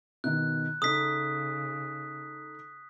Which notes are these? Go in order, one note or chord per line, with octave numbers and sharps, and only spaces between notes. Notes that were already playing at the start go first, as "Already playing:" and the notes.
B2 D#3 F#6
C#3 D#4 A4 D#6 B6